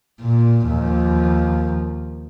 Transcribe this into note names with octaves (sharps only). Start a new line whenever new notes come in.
A#2
D#2 F3